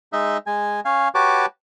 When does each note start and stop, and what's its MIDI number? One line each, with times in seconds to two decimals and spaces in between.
0.13 0.37 56
0.13 0.37 63
0.13 0.37 75
0.13 0.37 76
0.47 0.80 56
0.47 0.80 80
0.85 1.08 61
0.85 1.08 77
0.85 1.08 80
1.15 1.46 66
1.15 1.46 67
1.15 1.46 71
1.15 1.46 73
1.15 1.46 81
1.15 1.46 86